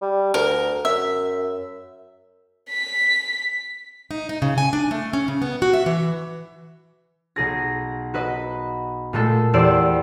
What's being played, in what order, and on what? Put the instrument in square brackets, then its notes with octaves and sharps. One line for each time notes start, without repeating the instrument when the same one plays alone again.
[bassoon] G3
[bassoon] D2 [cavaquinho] A#4
[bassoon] F#2 [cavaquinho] E5
[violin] B6
[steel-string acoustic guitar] D#4
D#4
C#3
G#5
D4
A3
C#4
C#3
B3
F#4
E5
E3
[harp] B1 G#4 A#6
F#4 B4 D#5 B5
A#2 G#3 A3 A4
E2 G4 C5 D5 E6 E7